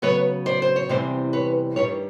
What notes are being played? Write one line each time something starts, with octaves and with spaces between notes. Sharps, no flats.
C#3 F#3 B3 B4 C#5
C5 D5
C5
C#5
E2 C3 E3 G3 C4 C5 D5
B4 C#5
G2 D#3 G3 B4 C#5